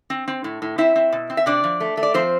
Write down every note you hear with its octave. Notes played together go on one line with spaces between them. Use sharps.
C4
C4
A2
A2
C4 E4 E5
C4
B2
C4
E5
C3 D4 D5
F3
A3
A3
D5
F3 C4 C5